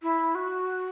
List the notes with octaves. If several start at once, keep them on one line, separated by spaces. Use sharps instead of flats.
E4
F#4